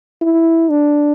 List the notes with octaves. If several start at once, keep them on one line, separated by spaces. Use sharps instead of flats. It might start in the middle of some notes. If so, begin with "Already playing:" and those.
E4
D4